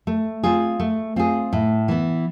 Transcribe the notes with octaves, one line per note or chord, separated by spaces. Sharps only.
A3
C4 F4 G#4
A3
C4 F4 G#4
A2
E3 B3